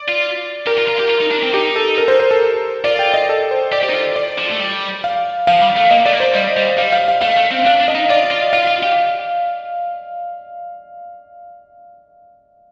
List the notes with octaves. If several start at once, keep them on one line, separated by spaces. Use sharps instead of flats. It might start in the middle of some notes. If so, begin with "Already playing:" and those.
Already playing: D5
F4
G4 A#4
F4
F4
G4
F4
D#4
D4
C4
D#4 G4
A4
A#4
C5
C5
A4
F4 D5
G5
D#5
A4
C5
G4 D5
G4
D#4
F4
D5
F3
A3
G3
F5
F3 F5
G3
A3
A#3 D#5
A3 D5
A#3
C5
G3 D#5
G3
G3 F5
F5
F5
A3 F5
A3
C4
D4 F5
D4
D#5
D#4
F4 D5
F4
F4 F5
F4
G4